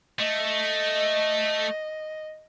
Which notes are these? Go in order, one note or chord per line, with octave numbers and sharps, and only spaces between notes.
A3 D#5